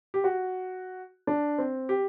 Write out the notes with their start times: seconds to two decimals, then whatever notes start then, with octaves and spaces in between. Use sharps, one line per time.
0.14 G4
0.24 F#4
1.27 D4
1.58 C4
1.89 G4